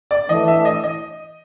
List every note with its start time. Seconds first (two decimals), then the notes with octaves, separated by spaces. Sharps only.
0.11 D5
0.29 E3 A3 D4 D#5
0.48 E5
0.65 D#5
0.84 D#5